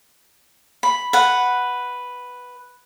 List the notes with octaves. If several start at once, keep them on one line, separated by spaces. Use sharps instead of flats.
B5
B4 F#5